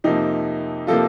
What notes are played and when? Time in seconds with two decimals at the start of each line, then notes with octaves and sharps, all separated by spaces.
0.04 F2 C3 F3 A#3 D#4
0.87 C3 F3 A#3 F4 A4